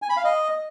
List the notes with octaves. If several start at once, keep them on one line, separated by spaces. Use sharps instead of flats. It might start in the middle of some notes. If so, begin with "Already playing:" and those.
G#5
B5
F5
D#5